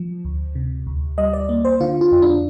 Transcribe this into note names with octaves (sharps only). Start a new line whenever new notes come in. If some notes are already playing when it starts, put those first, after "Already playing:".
Already playing: F3
D2
C3
D2
G3 D#5
D5
A#3
C5
D3 F4
F4
F2
D4